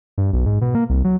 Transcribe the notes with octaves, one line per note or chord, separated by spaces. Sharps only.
G2
B1
G#2
B2
A#3
C2
F#3